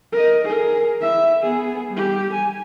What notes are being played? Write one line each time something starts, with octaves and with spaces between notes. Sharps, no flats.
A#4 D#5
G#4 A#4
E4 E5
B3 G#4
G3 G4
G#5